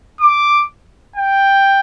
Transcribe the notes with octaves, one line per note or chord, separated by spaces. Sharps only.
D6
G5